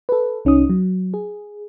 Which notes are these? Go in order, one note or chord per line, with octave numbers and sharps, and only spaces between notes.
A4 B4
C2 C#4 D#4 D#6
F#3
G#4